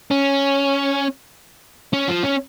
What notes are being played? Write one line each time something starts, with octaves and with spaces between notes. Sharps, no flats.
C#4
C#4
F3
C#4